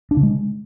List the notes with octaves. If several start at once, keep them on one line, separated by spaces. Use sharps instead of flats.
D4
C#3
G#3